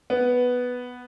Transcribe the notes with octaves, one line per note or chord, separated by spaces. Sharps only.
B3